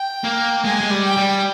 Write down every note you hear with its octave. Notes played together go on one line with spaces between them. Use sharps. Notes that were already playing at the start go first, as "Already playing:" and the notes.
Already playing: G5
A#3
G#3 G#5
G#3
G3
G5
G3